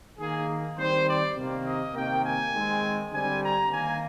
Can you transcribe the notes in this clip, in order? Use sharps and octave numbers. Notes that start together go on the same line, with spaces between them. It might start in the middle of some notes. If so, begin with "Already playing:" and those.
D#3 A#3 G#4
D#3 G3 C4 C5
D5
C3 D#3 A#3
D#5
C3 D#3 A#3 G5
G#5
D#3 G#3 C4
D3 G3 C4 G#5
A#5
D#3 A#3 G#5